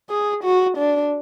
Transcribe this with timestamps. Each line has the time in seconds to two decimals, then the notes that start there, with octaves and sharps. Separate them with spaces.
0.10 G#4
0.43 F#4
0.78 D4